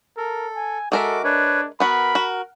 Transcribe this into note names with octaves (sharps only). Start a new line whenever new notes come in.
A4 A#4
G#5
G#3 F#4 A4 A#4 E5 D6
D4 B4 C#5
B3 F#4 A#4 B5
F#4